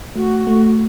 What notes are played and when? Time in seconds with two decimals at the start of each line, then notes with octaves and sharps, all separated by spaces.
0.16 A3 F#4
0.47 A3